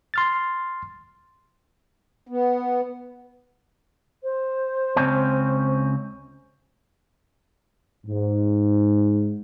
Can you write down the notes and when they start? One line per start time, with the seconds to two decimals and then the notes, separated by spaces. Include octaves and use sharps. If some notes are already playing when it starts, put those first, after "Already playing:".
0.14 C6 F6 A6
2.27 B3
4.23 C5
4.96 C#2 C4 C#4
8.06 G#2